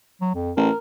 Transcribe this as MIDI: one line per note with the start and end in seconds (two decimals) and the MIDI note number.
0.21 0.31 54
0.35 0.52 41
0.57 0.70 33
0.57 0.78 70